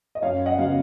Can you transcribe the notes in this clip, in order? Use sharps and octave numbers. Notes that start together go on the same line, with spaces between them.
D#5
F#2 C#5 F5
D#5 F#5
C#3 F#3 B3 F5